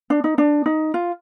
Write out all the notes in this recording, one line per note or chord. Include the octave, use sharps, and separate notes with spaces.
D4
D#4
D4
D#4
F4